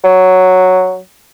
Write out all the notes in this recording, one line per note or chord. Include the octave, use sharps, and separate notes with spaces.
F#3